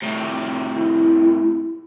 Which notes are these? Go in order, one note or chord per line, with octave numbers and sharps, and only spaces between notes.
A2 C3
E4